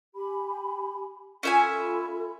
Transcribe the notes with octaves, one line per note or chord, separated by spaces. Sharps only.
G4 G#5 B5
C#4 F4 A4 E5 G#5 B5